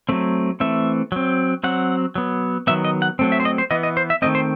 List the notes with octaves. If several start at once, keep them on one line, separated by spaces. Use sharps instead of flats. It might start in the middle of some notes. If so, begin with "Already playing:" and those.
F#3 A3 C4
E3 A3 C4 E5
F#3 C4
F#3 C4 F#5
F#3 B3
D#3 F#3 B3 E5
D#5
F#5
F#3 A3 C4
E5
C5
D#5
C5
E3 B3 D#5
D#5
C5
E5
D#3 A3 C4 D#5
C5